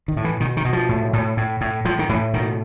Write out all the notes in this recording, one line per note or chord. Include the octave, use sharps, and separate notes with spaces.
D#3
A2
E3
B2 D#3
D#3
B2
F3
A2
A2
A2
A2
A2 F3
D#3
A2 E3
B2 D#3